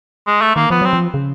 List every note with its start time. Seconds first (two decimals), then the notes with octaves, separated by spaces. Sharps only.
0.27 G#3
0.42 A3
0.56 D#3 A#3
0.70 F3 B3
0.82 F#3 C4
0.93 F3
1.14 C#3